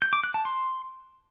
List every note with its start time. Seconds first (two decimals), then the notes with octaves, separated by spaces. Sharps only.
0.02 G6
0.13 D6
0.24 F#6
0.34 A5
0.45 C6